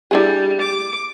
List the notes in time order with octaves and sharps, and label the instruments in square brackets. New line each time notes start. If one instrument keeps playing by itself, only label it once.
[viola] G3 [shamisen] D4 E4 G#4
[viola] D6